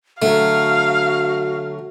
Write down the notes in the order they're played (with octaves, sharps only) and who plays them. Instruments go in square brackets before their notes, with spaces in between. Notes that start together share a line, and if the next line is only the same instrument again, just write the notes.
[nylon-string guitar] D3 F#3 [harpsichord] A3 [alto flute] F#4 [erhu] F5